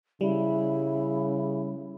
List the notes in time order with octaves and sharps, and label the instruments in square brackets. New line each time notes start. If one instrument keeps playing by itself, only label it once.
[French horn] C#3 [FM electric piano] G3 [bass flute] E4